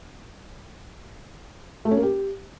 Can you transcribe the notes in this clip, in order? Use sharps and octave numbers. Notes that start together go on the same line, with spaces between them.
A3
C#4
A#3
G4